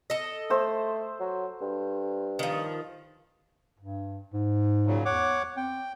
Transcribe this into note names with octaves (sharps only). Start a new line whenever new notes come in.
A4 D#5
A3 C5 E6
F#3
G2
D#3 F3
G2
G#2
A#2 C#3 F#3
E2 C#5 F#5 D6
C4 G5